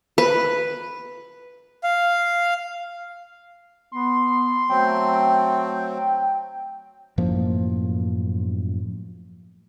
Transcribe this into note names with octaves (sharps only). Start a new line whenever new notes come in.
B4
F5
B3 C6
F#3 A3 C4 G5
F#2 A2 F3 A#3